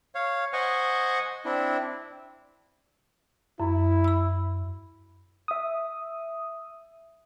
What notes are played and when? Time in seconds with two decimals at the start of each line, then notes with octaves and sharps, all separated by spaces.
0.15 C#5 F5
0.53 C5 D#5 F#5 G#5 C#6
1.45 C4 D4 E4
3.60 F#2 E4
4.04 B5 E6
5.48 E5 D#6